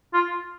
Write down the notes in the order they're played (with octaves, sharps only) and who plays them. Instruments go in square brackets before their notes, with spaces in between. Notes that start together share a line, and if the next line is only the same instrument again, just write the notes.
[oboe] F4